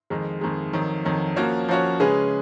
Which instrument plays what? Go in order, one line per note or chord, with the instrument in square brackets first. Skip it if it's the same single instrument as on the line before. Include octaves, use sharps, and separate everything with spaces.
[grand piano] F2 D#3 G#3
F2 D#3 G#3
F2 D#3 F#3
F2 D#3 F#3
F3 A#3 C#4 F#4 C#5
F3 A#3 C#4 F#4 C#5
C#3 G#3 C#4 G#4 B4